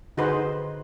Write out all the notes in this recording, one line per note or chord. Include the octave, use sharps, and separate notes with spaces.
D3 D#4 F#4 G#4 B4 C5